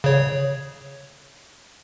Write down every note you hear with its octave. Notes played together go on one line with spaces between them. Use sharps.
C#3 C#5